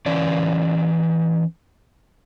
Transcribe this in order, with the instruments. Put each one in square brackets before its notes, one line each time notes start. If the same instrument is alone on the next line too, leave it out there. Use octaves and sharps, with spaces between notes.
[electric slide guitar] E3 C#4 D5